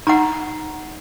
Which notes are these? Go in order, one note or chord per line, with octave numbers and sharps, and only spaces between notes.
D#4 F#5 A#5